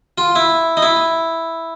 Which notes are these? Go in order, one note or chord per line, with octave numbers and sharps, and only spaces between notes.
F4
E4
D#4
E4